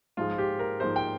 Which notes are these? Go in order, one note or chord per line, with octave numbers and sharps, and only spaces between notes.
G#2 F3 G#3 F4
G4
A#4
G#2 F3 G#3 C5
G5